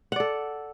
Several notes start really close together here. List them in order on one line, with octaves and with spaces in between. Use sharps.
F#5 D5 A4